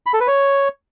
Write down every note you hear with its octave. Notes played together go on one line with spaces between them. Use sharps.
B5
A4
B4
C#5